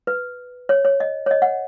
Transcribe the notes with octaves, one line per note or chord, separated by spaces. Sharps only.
B4
C#5
C#5
D#5
C#5
D#5
F#5